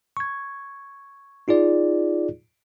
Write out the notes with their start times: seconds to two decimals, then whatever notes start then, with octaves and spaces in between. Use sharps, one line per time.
0.17 C#6 G#6
1.48 D#4 F4 G#4 D5